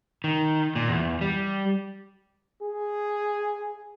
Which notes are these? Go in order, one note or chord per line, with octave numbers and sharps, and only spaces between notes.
D#3
A#2
E2
G3
G#4